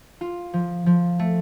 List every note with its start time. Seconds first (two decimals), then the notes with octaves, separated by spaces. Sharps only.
0.21 F4
0.53 F3
0.86 F3
1.19 A3